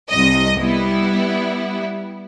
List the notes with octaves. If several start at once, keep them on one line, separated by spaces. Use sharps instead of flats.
C2 D#5
G3 B3 E4